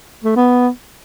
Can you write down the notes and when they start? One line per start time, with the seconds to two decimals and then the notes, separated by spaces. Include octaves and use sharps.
0.24 A3
0.36 B3